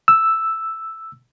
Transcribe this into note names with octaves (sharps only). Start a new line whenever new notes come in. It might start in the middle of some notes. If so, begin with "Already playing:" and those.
E6